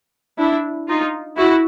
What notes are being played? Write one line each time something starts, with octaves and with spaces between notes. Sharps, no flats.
D4 E4
D#4 F4
E4 F#4